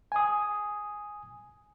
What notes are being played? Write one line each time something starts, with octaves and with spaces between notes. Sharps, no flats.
G#5 D#6